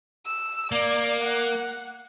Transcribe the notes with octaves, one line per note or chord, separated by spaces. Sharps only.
E6
A#3 D5
F#5